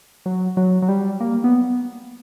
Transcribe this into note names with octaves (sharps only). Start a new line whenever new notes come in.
F#3
F#3
F#3
G3
A#3
B3